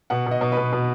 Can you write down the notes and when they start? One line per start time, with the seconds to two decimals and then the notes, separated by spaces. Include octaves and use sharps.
0.10 B2 F#5
0.27 B2 D#5
0.41 B2
0.52 B4
0.57 B2
0.73 B2